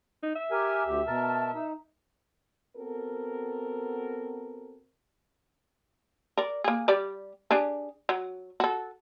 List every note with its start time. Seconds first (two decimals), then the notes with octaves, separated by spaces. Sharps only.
0.23 D#4
0.35 E5
0.51 G4 A#4 G#5
0.86 D2 G4
1.07 B2 A#4 A5
1.54 D#4
2.76 B3 C4 F#4 A4 A#4
6.37 A#4 D5
6.64 A#3 G#4
6.88 G3 G4 D5
7.51 D4 G4 G#4
8.09 F#3
8.60 F#4 A4